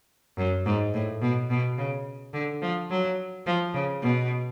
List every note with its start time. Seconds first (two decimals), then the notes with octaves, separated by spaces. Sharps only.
0.38 F#2
0.66 G#2
0.94 A2
1.22 B2
1.50 B2
1.78 C#3
2.34 D3
2.62 F3
2.90 F#3
3.46 F3
3.74 C#3
4.02 B2